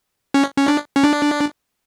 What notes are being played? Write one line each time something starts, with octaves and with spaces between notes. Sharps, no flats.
C#4
C#4
D4
C#4
D4